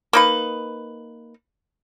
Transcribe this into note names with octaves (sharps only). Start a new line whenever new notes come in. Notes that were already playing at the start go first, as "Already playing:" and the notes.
A#3 D#4 B4